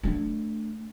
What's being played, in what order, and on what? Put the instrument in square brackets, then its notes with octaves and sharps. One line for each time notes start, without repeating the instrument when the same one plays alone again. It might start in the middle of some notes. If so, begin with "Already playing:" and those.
[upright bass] A3 D4